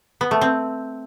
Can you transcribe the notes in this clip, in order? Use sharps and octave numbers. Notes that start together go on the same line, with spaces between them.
B3
A3
C4